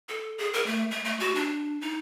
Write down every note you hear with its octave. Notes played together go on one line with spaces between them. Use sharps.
A4
G#4
A#4
A3
A3
A3
F#4
D4
D#4